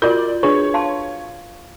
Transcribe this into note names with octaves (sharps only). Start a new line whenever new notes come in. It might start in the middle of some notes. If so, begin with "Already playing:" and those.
F4 F#4 A#4 D5 G6
D4 G#4 B4 C#5 C#6
F5 A5 C6